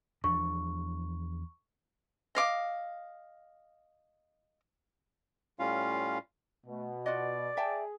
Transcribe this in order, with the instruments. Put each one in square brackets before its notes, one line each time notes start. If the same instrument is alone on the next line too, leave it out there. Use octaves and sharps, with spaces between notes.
[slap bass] E2 F3 D4 [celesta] C#6
[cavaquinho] D#5 F5 D6
[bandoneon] A2 G3 C#4 F4 F5
[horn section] B2 [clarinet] A3
[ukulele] F4 F#4 D#5 [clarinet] D5
[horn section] G#4 [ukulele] E5 G5 A5